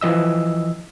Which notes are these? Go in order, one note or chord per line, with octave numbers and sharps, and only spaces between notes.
E3 F3 D#5 E6